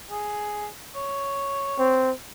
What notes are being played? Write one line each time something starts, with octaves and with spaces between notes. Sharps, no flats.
G#4
C#5
C4